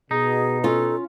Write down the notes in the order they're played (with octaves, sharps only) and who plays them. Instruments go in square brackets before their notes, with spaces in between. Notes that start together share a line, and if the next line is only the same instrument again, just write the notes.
[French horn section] B2 [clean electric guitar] D#4 [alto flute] G#4
[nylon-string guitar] C#4 F4 [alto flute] A4